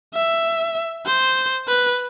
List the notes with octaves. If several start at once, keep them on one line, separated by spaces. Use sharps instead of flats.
E5
C5
B4